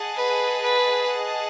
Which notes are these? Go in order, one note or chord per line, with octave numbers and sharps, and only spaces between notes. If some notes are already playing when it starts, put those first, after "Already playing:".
Already playing: G#4 D#5 F#5 A5
B4
B4